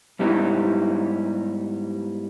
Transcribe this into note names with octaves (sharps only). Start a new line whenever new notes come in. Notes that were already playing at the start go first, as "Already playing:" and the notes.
G#2 G3 B3 D#4 E4